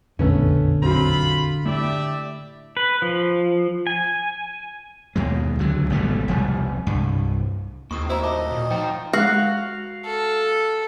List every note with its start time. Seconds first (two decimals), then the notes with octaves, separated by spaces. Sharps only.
0.19 E1 A#1 F2 D3 A3 B3 C#4
0.83 F#2 F#3 C4 F4 B5
1.65 A2 G4 D5 E5
2.77 B4
3.02 F3
3.87 G#5
5.16 D#2 B2 G#3
5.59 C#2 D3 F#3
5.90 G#1 B2 G3 A3
6.28 E1 C2 F3 G3
6.87 C2 G2
7.91 D#2 A#3 C4 E4 C#6 D#6
8.10 A2 E4 F#4 C5 A#5
8.23 D#5 A5 D6
8.51 A#2
8.71 F3 D#4 C5 G5 A#5
9.13 G#3 F#4 F5
10.06 A4